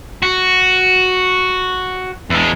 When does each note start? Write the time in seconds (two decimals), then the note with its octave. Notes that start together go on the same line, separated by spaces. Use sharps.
0.23 F#4
2.30 E2 G#3